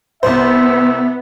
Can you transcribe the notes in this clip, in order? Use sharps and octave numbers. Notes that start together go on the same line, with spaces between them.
C2 B3 C5 E5